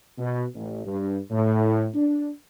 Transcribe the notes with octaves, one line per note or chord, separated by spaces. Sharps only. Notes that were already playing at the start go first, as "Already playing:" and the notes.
B2
A1
G2
A2
D4